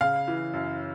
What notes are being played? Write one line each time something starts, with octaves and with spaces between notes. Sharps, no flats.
C#3 F5
E3
F#2